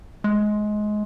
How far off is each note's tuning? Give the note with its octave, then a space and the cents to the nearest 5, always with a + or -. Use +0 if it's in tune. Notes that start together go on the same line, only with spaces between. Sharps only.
G#3 +20